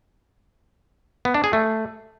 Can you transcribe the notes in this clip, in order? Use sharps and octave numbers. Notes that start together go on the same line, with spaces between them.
B3
D4
G#4
A3